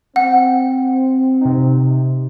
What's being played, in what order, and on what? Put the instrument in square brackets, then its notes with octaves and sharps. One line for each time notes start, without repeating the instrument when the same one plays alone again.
[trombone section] C4 [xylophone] F#5
[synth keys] C3 D#4